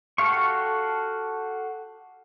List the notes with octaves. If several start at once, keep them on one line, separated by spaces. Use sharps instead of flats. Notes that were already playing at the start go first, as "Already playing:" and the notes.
F#4 G4 A4 F5 C#6